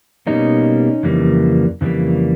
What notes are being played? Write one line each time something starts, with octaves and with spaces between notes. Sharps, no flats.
B2 G3 A#3 C#4 D#4
F2 C#3 E3 G3 A#3
F2 C#3 E3 G3 A#3